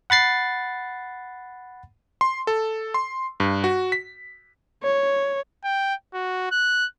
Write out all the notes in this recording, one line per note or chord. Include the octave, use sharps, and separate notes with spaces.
F#5 B5 A6 C7
C6
A4
C6
G2
F#4
B6
C#5
G5
F#4
F#6